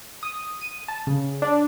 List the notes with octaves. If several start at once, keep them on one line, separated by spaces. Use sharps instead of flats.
D#6
D#7
A5
C#3
D4